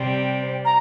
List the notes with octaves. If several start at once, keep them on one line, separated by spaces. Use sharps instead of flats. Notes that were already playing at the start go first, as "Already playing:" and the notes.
Already playing: C3 G3 C4
A#5